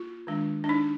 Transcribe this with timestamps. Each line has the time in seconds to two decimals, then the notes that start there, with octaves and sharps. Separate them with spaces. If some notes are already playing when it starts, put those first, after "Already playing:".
Already playing: A#3 F4
0.27 D#3 G#3 D4
0.64 D4
0.69 D#4